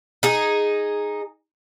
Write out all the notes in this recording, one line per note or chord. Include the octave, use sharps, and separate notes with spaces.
D#4 G#4